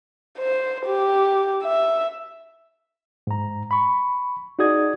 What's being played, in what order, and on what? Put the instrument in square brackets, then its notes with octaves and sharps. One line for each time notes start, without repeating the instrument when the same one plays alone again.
[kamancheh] C5
G4
E5
[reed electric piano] G#2 A#5
B5 C#6
D#4 F#4 G#4 D5 D#6 G#6